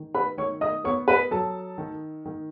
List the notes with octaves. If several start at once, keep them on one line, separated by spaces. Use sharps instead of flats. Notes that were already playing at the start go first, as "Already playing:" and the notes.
Already playing: D#3
B4 B5
D#3 C#5 C#6
D#5 D#6
B3 C#5 C#6
B4 B5
F#3 A4 A5
D#3
D#3